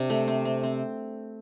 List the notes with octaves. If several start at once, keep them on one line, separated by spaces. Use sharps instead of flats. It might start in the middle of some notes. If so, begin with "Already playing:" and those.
Already playing: C3 D4
A3
C4
C4
C4